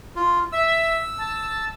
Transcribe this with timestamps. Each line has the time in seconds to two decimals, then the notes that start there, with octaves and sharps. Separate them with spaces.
0.16 F4
0.52 E5 E6
1.18 A5